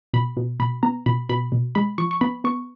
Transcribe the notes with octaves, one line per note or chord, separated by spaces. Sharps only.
B2 B5
B2
B2 B5
B3 A#5
B2 B5
B2 B5
B2
G#3 B5
F3 C#6
C#6
B3 B5
B3 C#6